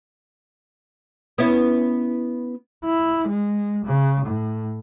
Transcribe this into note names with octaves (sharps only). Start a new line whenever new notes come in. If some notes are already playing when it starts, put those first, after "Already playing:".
B3 C#4 E4
E4
G#3
C#3
A2